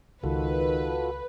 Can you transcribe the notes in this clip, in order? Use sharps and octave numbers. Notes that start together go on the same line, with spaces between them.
C#2 D#3 F4 F#4 A4 B4